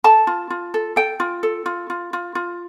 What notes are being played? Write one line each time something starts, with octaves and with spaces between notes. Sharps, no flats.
A4 A5
F4
F4
A4
A4 G5
F4
A4
F4
F4
F4
F4